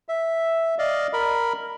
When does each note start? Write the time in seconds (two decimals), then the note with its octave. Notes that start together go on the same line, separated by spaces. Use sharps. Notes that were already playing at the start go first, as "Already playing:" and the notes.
0.09 E5
0.79 D5 D#5 F5
1.13 A#4 B5